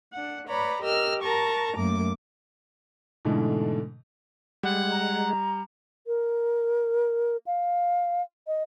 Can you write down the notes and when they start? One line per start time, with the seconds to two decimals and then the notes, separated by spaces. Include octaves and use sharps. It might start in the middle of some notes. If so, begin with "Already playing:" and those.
0.13 D4 F#5
0.48 B4 C#5 D5 A#5 B5
0.82 G4 A#4 D#5 E6 F6
1.22 A#4 A5 A#5 C#6
1.76 F#2 A3 A#3 D6
3.25 G#2 B2 D3 E3 A3
4.63 G3 G#3 F#5
4.91 A#5
6.07 A#4
7.47 F5
8.47 D#5